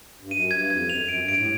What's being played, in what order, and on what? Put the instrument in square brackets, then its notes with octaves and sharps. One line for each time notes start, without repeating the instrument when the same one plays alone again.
[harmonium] G2
[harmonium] F#2 [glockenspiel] D#7
[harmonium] G2 [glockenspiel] G#6
[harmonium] F#2
[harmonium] F2 [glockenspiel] G#6
[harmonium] F#2 [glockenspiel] F7
[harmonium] F#2 [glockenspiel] D7
[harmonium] G2
[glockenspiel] D7
[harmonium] A2